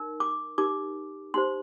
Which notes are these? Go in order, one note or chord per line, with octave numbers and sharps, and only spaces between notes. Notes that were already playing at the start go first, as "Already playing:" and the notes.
Already playing: D#4 A#4
D6
D#4 G4 A#4 D6
D#4 G4 C5 C6